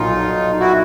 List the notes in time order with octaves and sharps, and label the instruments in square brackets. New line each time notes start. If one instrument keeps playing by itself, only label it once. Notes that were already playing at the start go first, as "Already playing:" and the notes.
Already playing: [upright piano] B1 A#2 F#3 [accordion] D#4 F4
[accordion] E4 F#4